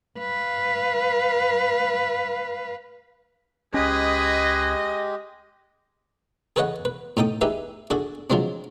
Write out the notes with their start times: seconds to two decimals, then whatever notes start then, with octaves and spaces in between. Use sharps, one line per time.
0.19 B4 F5
3.74 C#2 G#3 C#4 G4 G#4 B4 D#5
6.56 G#4 A4 B4 C#5 D#5 F#5
6.85 B4
7.17 A2 D#4 A4 G5 D#6
7.41 D#4 G4 G#4 B4 E5
7.90 D4 F#4 G#4 A4
8.30 F3 F#3 G#3 C4 D4